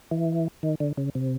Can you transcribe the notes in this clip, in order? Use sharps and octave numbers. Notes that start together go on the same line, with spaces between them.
E3
D#3
D3
C#3
C3